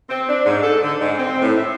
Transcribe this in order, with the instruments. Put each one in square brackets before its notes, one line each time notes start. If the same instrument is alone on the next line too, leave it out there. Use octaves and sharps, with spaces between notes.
[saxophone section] C4
D4
G#2
A4
D3
G#2
C4
A2
E5